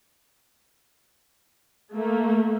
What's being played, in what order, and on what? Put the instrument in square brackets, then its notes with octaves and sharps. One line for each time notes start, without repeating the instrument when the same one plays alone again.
[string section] A3 A#3